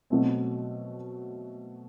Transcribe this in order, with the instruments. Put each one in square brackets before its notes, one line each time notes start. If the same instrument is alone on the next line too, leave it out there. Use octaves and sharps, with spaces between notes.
[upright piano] B2 F#3 A3 C4